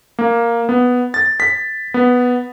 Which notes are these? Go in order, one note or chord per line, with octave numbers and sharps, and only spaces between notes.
A#3
B3
A6
B6
B3